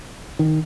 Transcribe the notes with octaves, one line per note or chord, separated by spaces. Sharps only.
D#3